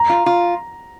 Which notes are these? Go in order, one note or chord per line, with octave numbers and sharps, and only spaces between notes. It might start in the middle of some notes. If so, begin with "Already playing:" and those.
Already playing: A#5
F4
F4